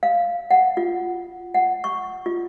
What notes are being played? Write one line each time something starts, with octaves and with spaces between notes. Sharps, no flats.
F5
F#5
F4
F#5
C#6
F4